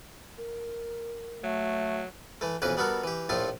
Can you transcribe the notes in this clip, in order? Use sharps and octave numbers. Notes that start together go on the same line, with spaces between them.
A#4
F#3 A3
E3 A3
B1 F2 E3 C#4 B4 D6
G3 B3 F#4 A4 A#4
E3 G4
A#1 A2 F3 A3 A4 C6